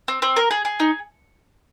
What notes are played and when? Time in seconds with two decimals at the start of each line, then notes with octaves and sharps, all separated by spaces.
0.08 C4
0.22 C4
0.36 A#4
0.51 G#4
0.65 G#4
0.80 D#4